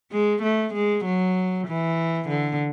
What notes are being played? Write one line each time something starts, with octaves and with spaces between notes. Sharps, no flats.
G#3
A3
G#3
F#3
E3
D3